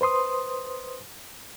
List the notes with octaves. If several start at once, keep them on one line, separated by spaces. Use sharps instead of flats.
B4 C5 C6 D#6